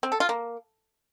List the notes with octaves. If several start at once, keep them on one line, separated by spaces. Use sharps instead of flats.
C4
A4
F4
A#3